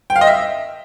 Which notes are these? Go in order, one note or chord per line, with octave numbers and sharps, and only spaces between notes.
G5
F5
D#5
E5